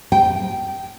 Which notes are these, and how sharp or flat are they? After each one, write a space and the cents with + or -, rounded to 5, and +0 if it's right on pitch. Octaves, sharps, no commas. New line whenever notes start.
G5 -15